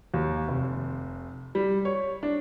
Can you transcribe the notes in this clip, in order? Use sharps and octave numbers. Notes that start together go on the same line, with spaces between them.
D#2
F1
G3
C#5
D4